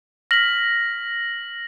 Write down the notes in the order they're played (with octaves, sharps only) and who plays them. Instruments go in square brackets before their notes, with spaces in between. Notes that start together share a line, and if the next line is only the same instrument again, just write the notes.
[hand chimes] F6 B6 [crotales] A#6 F#7